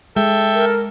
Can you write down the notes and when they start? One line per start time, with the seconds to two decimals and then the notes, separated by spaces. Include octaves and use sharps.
0.16 G#3 A4 E5 G5
0.54 A#4